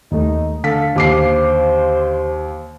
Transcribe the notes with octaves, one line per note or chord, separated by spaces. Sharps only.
D#2 A3 D#4
D3 A4 F5 B6
D#2 C5 D6 C7